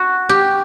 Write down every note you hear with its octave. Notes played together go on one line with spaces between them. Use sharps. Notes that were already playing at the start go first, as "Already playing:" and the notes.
Already playing: F#4
G4